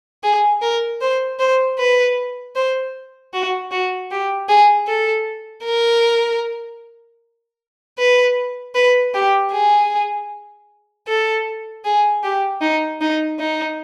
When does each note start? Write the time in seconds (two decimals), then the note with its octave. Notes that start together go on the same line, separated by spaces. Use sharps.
0.24 G#4
0.62 A#4
1.01 C5
1.39 C5
1.79 B4
2.56 C5
3.34 F#4
3.71 F#4
4.11 G4
4.49 G#4
4.88 A4
5.65 A#4
7.98 B4
8.75 B4
9.14 G4
9.52 G#4
11.08 A4
11.85 G#4
12.24 G4
12.62 D#4
13.01 D#4
13.39 D#4